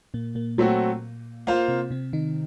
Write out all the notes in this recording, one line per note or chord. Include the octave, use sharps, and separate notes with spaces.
A#2 A#3
A#2 A#3
A#2 F#3 A3 A#3 C4 F#4
A#3 F4 C5 F5
C3 C4
C3 C4
D#3 D#4